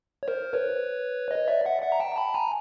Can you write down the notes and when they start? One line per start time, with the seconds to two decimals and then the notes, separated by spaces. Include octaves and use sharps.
0.23 C#5
0.28 A#4 C5
0.53 B4 C#5
1.31 C#5 D#5
1.48 D5 E5
1.65 E5 F#5
1.83 E5 F#5
1.92 A#5
2.00 G5 A5
2.17 A5 B5
2.34 G#5 A#5